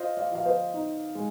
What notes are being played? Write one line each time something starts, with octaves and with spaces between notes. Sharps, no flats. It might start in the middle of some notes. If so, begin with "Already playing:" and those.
Already playing: F4 C5 D#5
D5 F5
F3 F5
C5 D#5
D#4
G#3